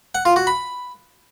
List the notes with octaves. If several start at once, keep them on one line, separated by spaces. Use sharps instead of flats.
F#5
F4
F#4
B5